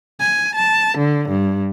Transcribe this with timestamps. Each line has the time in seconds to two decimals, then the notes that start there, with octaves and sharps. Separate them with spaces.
0.20 G#5
0.55 A5
0.98 D3
1.29 G2